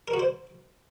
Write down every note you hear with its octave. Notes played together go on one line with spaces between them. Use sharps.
A#4
F#4
C5